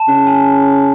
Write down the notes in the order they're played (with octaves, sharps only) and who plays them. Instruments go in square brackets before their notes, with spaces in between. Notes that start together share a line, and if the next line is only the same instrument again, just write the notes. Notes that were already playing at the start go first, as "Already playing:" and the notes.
Already playing: [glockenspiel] A5
[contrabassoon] C#3
[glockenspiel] G#5